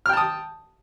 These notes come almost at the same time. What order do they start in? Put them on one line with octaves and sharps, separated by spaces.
F6 G5 A5 D#6